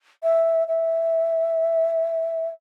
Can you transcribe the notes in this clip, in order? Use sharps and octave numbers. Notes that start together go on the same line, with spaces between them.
E5
E5